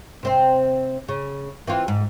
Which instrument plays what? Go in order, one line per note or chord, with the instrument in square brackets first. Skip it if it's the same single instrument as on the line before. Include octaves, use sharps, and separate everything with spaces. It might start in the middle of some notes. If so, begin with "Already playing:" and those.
[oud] C3 C4 C5
C#3
E3 C4 F4
G#2